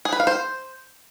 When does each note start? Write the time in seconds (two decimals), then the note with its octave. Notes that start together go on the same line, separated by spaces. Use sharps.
0.05 G#4
0.12 B4
0.20 F5
0.27 C5